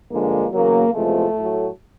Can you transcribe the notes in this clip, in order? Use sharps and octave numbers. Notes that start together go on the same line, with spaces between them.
G2 D3 F3 G#3 A#3
E2 C#3 F#3 A#3
E2 C3 F3 G#3 A3
A2 F#3